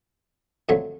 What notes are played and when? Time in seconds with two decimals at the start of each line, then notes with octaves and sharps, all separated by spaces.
0.69 F2 D3 F#3 A3